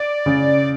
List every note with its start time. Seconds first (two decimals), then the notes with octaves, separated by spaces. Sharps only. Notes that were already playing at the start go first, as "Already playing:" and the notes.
Already playing: D5
0.26 C#3